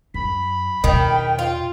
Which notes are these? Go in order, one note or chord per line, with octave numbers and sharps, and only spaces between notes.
F#2 B5
E2 B2 D#3 G5
F4